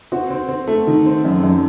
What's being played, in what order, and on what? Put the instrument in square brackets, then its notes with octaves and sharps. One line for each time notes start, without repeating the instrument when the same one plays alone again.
[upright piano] C4 F#4
C4
C4
A3
D#3
C4
F#2
F#2